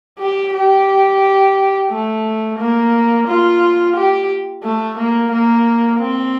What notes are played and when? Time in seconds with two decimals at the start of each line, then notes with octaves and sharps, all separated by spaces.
0.19 G4
0.54 G4
1.91 A3
2.59 A#3
3.27 F4
3.96 G4
4.64 A3
4.98 A#3
5.32 A#3
6.00 C4